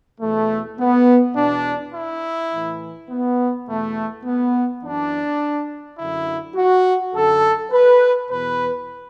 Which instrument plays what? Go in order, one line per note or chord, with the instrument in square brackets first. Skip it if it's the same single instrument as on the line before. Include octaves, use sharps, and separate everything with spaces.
[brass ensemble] E2 B2 A3
B3
E2 B2 D4
E4
A2 E3
B3
E2 B2 A3
B3
F#2 E3 D4
F#2 D3 E4
F#4
F#2 D3 A4
B4
E2 B2 B4